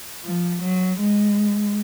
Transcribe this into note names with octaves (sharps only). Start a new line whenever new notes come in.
F3
F#3
G#3